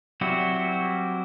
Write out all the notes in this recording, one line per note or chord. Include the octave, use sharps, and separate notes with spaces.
F#3 G3 C4 E4 F#4